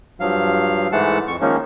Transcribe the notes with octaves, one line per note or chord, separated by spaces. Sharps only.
G2 F3 F#3 F5
G#2 E3 G#3 A3 F#5 A5
F2 C#6
D#3 F3 G#3 A#3 C#4 D#4